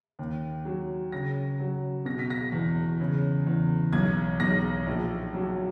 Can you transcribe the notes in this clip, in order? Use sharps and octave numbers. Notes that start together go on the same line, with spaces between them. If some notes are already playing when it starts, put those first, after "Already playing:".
D#2
F#3
C#3 A#6
F#3
B2 A#6
B6
A#6
E2
C#3
E2
B1 G#6
B1 A#6
A#1
F#3